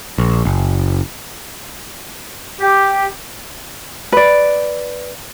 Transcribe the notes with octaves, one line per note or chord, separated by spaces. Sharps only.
A#1
F#1
G4
B4 D5